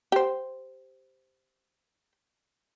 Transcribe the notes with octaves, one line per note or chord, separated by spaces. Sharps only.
G4 C5